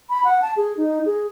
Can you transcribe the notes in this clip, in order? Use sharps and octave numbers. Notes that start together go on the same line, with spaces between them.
B5
F#5
A5
G#4
D#4
G#4